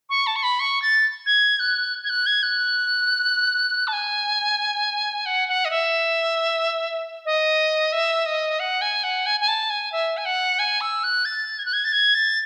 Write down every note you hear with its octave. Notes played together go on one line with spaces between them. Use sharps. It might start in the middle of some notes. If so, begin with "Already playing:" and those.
C#6
A5
C#6
B5
C#6
A6
G#6
F#6
G#6
F#6
G#6
F#6
A5
G#5
F#5
F#5
D#5
E5
D#5
E5
D#5
F#5
G#5
F#5
G#5
G#5
A5
G#5
E5
G#5
F#5
G#5
E6
F#6
A6
G#6
F#6
G#6
A6
G#6
A6